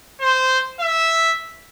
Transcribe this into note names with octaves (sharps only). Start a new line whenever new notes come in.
C5
E5